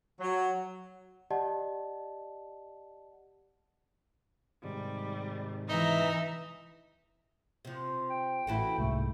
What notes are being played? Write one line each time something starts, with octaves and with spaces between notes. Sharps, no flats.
F#3
G4 D5 D#5 F#5 A5
G#2 C3 D#3 G3
E3 D#4 E5 A#5
C3 F3
G5
A1 E4 F#4 A4
C2 G#2 A3